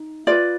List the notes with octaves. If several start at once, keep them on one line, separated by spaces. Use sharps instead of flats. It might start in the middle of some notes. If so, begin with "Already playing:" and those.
Already playing: D#4
F4 B4 D5